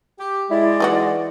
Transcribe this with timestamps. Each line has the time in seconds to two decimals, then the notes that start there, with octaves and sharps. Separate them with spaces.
0.18 G4
0.50 G#3 E4 D5
0.80 E3 F#3 D#4 F#4